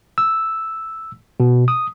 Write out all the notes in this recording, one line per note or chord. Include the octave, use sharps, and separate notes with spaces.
E6
B2
D#6